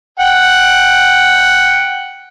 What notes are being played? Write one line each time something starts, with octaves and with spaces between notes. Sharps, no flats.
F#5 G5